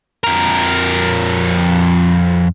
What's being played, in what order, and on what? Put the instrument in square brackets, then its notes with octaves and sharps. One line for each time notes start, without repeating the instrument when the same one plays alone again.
[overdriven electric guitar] F2 A#4